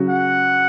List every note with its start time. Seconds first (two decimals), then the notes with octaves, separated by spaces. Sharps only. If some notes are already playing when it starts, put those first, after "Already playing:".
Already playing: C#3 F#3 C#4 F#4
0.10 F#5